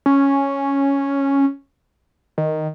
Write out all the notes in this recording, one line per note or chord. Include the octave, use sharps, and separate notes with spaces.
C#4
D#3